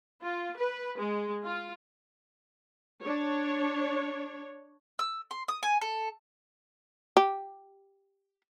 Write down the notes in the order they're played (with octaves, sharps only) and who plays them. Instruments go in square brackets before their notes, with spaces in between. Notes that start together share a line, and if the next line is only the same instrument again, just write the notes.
[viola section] F4
B4
G#3
F4
D4 C#5
[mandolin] E6
C6
D#6
G#5
A4
[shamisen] G4